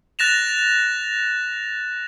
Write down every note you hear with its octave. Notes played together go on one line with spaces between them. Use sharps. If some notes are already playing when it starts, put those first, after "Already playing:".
F#6 A6 A#6 E7 F7